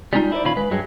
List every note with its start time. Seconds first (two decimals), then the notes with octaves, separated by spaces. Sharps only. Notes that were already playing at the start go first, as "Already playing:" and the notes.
0.13 G3 G#3 C4 C#4 D#4 F4
0.32 E4 B4 C5 D5
0.44 A#2 D#3 C#4 F4 B5
0.57 G#3 B4
0.71 G2 F#3 G#3